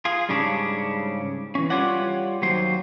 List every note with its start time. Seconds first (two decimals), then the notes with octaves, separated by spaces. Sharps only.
0.05 F4 G#4
0.29 G#2 C#3 G3 C#4 D4
1.55 E3 C#4
1.70 G3 F4 G4 C#5 D5 F#5
2.42 D#2 F#3 C5